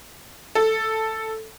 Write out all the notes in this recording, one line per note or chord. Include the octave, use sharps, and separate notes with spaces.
A4